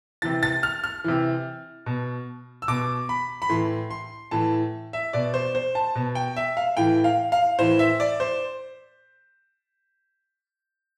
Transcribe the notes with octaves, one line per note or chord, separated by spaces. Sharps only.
C3 E3 A6
A6
F6
F6
C3 E3
B2
E6
B2 D6
B5
B5
A2 E3 C6
C6
A2 E3 A5
E5
B2 D5
C5
C5
A5
B2
G5
E5
F5
A2 E3 G5
F5
F5
A2 E3 C5
E5
D5
C5